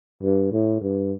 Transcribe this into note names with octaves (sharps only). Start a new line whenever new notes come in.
G2
A2
G2